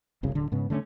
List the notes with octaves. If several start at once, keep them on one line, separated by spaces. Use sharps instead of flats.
F#1 C2 F#2 C#3
D1 D3
G#2 C#3 B3
D3 A3 C4 C#4